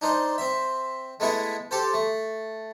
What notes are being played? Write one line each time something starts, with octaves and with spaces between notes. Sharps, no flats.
D4 D#4 C5
C4 E5
G#3 A3 B3 E4 G#4
G4 A4 C5
A3